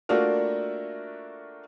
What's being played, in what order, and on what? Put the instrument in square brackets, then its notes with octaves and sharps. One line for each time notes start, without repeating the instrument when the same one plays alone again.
[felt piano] A3 A#3 D4 F4 F#4 A#4